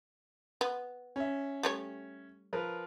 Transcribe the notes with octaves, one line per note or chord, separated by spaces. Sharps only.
B3
C#4 E5
G3 A3 C#5
F3 A#4 B4